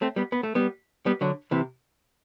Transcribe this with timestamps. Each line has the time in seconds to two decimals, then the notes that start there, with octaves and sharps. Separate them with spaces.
0.02 A3 C4
0.16 G3 B3
0.32 B3
0.43 A3
0.55 G3 B3
1.06 G3 B3
1.21 D3 F#3
1.51 C3 E3